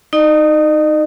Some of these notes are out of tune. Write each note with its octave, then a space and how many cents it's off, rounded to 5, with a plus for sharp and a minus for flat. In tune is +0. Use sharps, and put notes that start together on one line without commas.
D#4 +0 D#5 -40